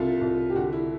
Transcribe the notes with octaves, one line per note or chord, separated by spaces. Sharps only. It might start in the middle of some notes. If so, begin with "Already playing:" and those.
Already playing: C2 F4 A4
C2
G4
D3 F#4
E4